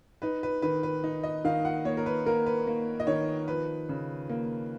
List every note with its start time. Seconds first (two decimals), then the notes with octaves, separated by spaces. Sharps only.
0.22 D#4 B4
0.43 B4
0.62 D#3 B4
0.83 B4
1.04 D#4
1.23 D#5
1.44 D#3 F5
1.65 F#5
1.85 A#3 C#5
1.97 A#4
2.06 B4
2.26 A#3 A#4
2.46 B4
2.67 A#3
3.00 D#5
3.07 D#3 C#5
3.48 F3 B4
3.89 C#3
4.29 A#3